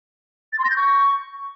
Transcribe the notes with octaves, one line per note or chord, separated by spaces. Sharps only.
A6
C6
A#6
G6
C#6